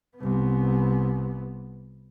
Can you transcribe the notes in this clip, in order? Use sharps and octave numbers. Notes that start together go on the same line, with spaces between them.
C2 B3